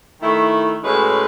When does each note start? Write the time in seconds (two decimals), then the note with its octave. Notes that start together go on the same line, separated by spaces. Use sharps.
0.20 D#3 A3 E4
0.83 A2 G#3 C#4 F#4 B4